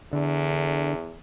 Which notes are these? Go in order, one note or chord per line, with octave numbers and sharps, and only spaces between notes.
E2 D3